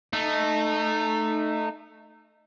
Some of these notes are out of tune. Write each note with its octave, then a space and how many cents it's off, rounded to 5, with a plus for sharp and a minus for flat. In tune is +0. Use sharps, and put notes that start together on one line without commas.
A3 +0 D#4 -20